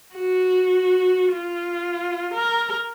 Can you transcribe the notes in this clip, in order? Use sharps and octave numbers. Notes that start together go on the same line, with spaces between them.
F#4
F4
A#4